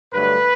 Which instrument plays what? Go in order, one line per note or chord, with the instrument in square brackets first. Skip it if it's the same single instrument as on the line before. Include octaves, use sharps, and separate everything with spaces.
[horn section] G2 D3 F#3 A3 B4